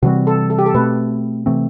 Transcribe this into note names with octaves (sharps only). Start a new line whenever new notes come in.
C3 E3 G3 C4 F#4
A4
A4
G4
A4
B2 A3 C4 B4
C3 E3 A3 C4